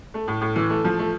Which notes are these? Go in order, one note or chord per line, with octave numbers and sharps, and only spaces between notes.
A3
A2
A2
E3
A3
F3
A3